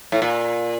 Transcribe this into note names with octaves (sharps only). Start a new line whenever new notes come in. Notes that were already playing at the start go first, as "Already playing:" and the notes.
A2
A#2